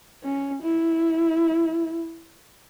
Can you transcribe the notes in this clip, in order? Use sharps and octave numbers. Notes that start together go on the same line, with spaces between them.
C#4
E4